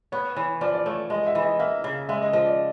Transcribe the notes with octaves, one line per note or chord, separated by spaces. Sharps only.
B3 C#5
E3 C#5
F3 D5
D5
A3 C#5
G#3 D#5
E5
E3
D#5
A#3 E5
C#3
G#3 E5
D#5
F3 D#5
D5